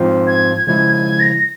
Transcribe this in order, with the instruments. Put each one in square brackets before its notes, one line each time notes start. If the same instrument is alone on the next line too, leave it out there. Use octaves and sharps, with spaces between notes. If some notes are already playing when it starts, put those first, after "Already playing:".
Already playing: [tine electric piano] G#2 F3 C4 F4 C5
[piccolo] G#6
[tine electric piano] C#3 F3 G#3 E4 [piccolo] G#6
[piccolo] G#6
A#6